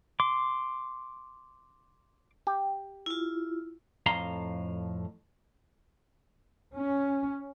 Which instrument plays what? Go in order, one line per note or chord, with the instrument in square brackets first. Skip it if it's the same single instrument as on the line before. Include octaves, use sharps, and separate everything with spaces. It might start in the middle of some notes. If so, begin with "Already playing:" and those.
[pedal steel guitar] C6 D6
[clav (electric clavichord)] G4
[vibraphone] E4 F4
[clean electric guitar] F2 A2 F5 A#5 C6
[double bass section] C#4